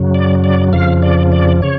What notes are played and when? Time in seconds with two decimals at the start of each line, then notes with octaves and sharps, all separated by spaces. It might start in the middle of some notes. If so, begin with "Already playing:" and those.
Already playing: F#2 C#3 F#3
0.15 D5
0.44 D5
0.73 F2 C#3 F3 F5
1.02 D5
1.32 D5
1.62 C#3 C#5